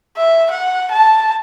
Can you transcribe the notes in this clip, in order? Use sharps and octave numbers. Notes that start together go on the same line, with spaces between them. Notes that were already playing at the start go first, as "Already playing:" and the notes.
E5
F#5
A5